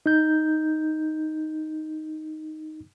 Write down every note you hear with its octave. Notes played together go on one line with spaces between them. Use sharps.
D#4 G6